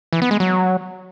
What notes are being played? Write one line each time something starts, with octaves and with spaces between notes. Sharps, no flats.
E3
B3
G#3
F#3